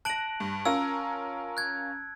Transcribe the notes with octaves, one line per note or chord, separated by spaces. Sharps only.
A5 F#6 A#6 D7 F#7
G2
C#4 F4 A#4 E6
F#6 G#6